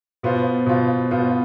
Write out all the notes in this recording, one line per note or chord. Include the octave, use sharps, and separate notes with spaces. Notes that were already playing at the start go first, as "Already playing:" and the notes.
B2 B3 F4 C5
B2 B3 F4 C5
B2 B3 F4 C5